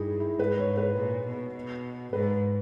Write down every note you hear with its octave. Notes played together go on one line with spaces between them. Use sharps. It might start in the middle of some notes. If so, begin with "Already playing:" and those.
Already playing: G2 D#4 E4 G#4
E4
G#2 B4
C#5
B4
A#2
B2
B2
G#2 B4